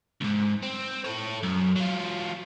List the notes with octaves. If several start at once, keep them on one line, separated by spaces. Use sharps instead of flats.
C#2 G#2
C4
A4 C#5
F#2
F#3 F4